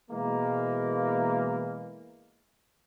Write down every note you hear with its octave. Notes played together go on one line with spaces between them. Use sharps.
B2 E3 G#3 A#3